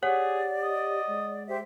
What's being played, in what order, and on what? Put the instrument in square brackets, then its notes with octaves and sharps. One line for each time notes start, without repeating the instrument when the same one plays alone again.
[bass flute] G4 [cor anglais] G#4 [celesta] C#5 F#5 [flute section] D5
[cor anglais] D#5
[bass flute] G#3
[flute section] G4 C5 E5